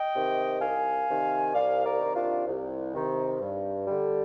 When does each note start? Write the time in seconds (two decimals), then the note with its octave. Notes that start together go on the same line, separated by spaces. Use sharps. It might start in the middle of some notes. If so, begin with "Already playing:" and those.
Already playing: D#5 G5
0.13 C3 D#3
0.60 C2 F5 G#5
1.07 C3 D#3
1.54 C2 D5 F5
1.85 A#4 D5
2.00 C3 D#3
2.16 D4 F4
2.47 C2
2.93 C3 D#3
3.40 G2
3.87 D3 G3